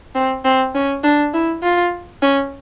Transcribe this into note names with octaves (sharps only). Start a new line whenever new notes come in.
C4
C4
C#4
D4
E4
F4
C#4